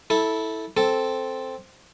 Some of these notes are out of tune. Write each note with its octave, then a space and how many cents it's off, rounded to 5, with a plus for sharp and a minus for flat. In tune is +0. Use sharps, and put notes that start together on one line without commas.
E4 -15 A4 +0
C4 +0 A4 +0